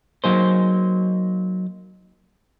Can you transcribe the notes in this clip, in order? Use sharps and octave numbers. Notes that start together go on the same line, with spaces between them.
F#3 A#3 D#4 G#4 C5